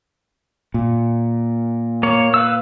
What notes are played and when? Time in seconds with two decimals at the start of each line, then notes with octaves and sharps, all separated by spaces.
0.74 A#2
2.03 A#3 C#5
2.34 B4 F5 E6